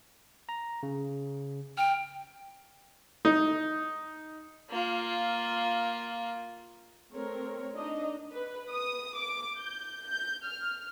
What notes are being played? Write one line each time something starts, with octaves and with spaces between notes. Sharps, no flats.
A#5
C#3
G5 F6
D#4
A#3 F4
A3 C4 A#4 C#5
D4 D#4 D#5
B4
D#6
D6
G6
G6
F6